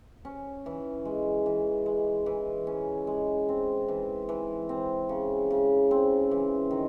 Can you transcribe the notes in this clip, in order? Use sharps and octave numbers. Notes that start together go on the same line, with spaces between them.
C#4
E3
G#3
E3
G#3
E3
C#4
G#3
C4
E3
E3
C4
C#3
C#3
C4
E3
D#3